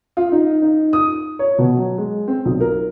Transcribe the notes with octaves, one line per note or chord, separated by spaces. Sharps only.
F4
D#4
D#4
D#6
C#5
B2
F#3
G#3
C4
B1
A#4